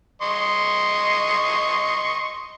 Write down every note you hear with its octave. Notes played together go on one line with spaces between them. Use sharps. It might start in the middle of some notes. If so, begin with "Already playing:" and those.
D#5 C6 C#6